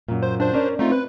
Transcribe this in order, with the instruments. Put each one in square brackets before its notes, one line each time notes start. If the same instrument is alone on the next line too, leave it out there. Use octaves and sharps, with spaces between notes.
[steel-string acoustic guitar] F#2 A#2
[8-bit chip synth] C5
D4 C5
[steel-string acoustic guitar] C#4 A#4 D5
[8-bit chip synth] A3 D#4 F4 [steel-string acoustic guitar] C4
[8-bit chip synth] B4